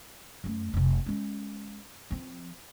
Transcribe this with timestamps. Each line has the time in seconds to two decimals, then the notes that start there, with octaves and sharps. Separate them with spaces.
0.44 F#2 A3
0.74 F1 C3
1.06 G#3 C#4
2.11 F3 C4